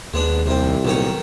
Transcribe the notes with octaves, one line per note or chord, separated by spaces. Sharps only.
D#2 G#3 B3 D4
C2 C3 C4
B1 A#2 D#3 C#5